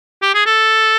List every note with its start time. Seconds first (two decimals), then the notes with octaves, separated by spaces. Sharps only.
0.22 G4
0.34 G#4
0.46 A4